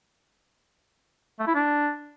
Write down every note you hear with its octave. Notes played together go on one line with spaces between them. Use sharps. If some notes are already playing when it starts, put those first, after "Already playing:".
A3
E4
D4